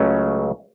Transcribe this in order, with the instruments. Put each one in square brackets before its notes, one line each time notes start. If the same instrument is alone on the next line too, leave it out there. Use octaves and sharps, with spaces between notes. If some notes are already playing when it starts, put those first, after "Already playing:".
Already playing: [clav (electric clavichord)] C#2 C#3 F#3 A3 C#4